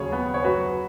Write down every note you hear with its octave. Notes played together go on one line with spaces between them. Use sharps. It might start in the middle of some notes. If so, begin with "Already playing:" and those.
Already playing: D#2 C#3 F#3 G#4 C#5
B3
C#5
F#2 F#3 F#4 B4